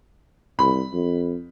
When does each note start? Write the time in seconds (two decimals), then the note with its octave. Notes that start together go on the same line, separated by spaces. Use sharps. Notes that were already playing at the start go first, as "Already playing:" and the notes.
0.59 C2 B5
0.93 F2